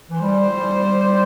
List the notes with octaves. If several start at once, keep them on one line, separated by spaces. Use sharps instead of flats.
E3
G3 C5
G3